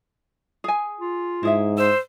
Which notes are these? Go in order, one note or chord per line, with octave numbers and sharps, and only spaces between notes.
G#4 G#5
F4
G#2 E4 G#4 E5
C5 E6